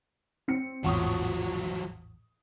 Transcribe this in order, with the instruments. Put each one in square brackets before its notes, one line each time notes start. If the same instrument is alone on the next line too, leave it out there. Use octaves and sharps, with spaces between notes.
[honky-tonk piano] C4 C#7
[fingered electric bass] A1 E2 G#2 [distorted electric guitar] F3 F#3 [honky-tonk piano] F#5 C#6 D#6